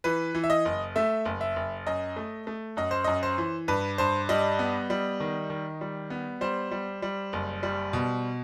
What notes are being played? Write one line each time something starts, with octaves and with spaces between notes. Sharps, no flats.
E3 B4
E3
E5
D#5
F#1
A3 E5
F#1
E5
F#1
F#2 D#5
A3
A3
F#2 D#5
C5
F#2 D#5
C5
E3
G2 B4
G2 C5
G3 D#5
B3
G3
D#3
D#3
G3
B3
G3 C5
G3
G3
F#1
G3
B2